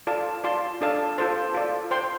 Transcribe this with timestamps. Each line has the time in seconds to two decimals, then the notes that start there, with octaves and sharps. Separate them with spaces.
0.07 F4 A4 D5 F5 A5
0.44 F4 D5 A5 C6
0.81 D4 A4 D5 F5 A5
1.18 F4 A4 C5 A5
1.54 F4 A4 D5
1.91 C5 G5 C6